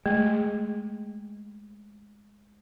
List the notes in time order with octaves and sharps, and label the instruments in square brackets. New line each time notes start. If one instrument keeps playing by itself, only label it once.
[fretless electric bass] G#3 [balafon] A3